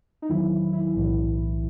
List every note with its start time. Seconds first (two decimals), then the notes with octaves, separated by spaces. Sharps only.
0.22 D#4
0.29 E2 D#3 F#3 E4
0.73 E4
0.95 B1 A2 E3